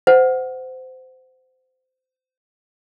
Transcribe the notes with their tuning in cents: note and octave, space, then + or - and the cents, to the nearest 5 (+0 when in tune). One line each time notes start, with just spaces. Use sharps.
C5 -25 F#5 +0